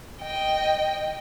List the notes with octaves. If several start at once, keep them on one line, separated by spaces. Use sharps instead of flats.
D#5 G5